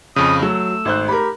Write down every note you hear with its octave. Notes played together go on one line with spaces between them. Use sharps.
F2 C#3 D#6
F#3 A3 E6
G#1 C5 F#6
G4 A#4 B5